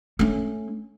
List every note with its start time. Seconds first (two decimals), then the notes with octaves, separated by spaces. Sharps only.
0.19 A3 C#4